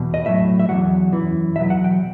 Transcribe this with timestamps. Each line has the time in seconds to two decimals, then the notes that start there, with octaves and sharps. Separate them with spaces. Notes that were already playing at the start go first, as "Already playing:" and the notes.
Already playing: E2 B2
0.14 D#5
0.26 A2 F#3 E5
0.59 E5
0.69 E2 D#3 F#3 F#5
1.13 F#2 E3
1.56 E2 B2 F#3 E5
1.70 F#5
1.84 G5